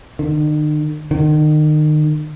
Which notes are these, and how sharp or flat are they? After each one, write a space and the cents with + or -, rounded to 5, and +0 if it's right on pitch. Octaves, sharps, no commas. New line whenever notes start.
D#3 -45
D#3 -35